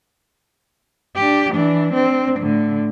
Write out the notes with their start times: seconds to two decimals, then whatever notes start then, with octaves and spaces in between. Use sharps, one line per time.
1.16 D4 G4
1.53 E3 D4
1.93 C4 D4
2.40 A2 D3